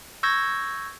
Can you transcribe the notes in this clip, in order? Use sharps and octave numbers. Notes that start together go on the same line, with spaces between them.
C#6 E6 G6 G#6 A#6